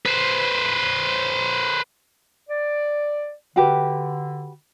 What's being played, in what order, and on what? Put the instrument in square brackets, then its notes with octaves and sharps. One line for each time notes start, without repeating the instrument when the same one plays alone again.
[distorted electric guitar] B4 C5
[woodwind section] D5
[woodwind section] D3 [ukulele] F#4 G4 B4